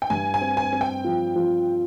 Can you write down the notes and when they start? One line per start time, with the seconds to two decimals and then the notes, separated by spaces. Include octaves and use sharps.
0.02 G5
0.10 G2 G#5
0.34 G#5
0.41 C4
0.57 G#5
0.73 C4
0.81 G5
1.04 F3
1.36 F3